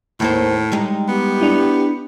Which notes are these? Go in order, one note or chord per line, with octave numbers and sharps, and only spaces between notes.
D#2 A2 A#3 C4
G3 G#3 D#4
B3 G4
D4 E4